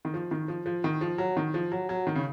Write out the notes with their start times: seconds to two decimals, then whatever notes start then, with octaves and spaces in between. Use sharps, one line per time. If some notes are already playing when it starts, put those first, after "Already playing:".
0.05 D#3
0.14 F3
0.31 D#3
0.48 F3
0.66 F3
0.84 D#3
1.01 F3
1.18 F#3
1.37 D#3
1.54 F3
1.72 F#3
1.89 F#3
2.07 D#3
2.15 C#3